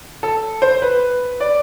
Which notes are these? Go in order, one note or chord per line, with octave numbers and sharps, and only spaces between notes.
A4
C5
B4
D5